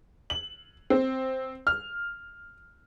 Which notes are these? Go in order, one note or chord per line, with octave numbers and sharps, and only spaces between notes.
F#7
C4
F6